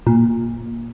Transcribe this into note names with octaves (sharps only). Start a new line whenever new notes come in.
A#2